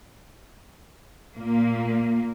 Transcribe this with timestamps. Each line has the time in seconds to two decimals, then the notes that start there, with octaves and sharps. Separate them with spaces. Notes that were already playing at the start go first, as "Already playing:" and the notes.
1.37 A#2 A#3